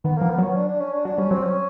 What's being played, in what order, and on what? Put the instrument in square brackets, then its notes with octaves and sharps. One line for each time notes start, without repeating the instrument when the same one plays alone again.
[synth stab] D#3 [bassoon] B3
[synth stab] F3 [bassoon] A#3
[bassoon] B3
[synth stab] F#3 [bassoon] C#4
[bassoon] D4
D4
C#4
D4
[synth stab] F#3 [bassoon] D4
[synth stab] G3 [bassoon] C#4
[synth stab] F#3 [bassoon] C4
[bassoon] C#4